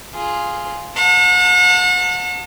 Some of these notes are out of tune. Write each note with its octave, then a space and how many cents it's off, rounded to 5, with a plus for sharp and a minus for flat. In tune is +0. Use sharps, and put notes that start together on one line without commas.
F4 +0 G#4 +0
F#5 -40 A5 +35